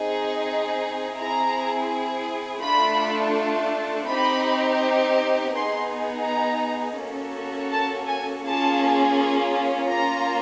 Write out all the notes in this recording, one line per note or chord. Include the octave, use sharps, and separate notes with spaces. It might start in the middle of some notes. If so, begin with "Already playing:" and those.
Already playing: C4 D#4 G#4
C4 E4 G#4 A#5
A3 D4 F4 A4 B5
C4 D#4 G4 B5
B3 D#4 G#4 C6
A#5
A#3 C#4 F#4 A4
A5
G#5
A#3 C#4 F4 G#4 A5
A#3 C#4 F4 A#5